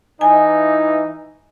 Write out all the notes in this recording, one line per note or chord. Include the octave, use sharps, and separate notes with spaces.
E3 D#4 G#5